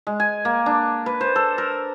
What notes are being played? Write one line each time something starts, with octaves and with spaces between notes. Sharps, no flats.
G#3
G#5
A#3
D4
B4
C5
A4
A#4